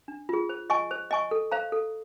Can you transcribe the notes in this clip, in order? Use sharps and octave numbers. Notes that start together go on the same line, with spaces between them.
D4
F4 G#4
C5
D#5 G#5 C#6
C5
D#5 G#5 C#6
A4
C5 F5 A#5
A4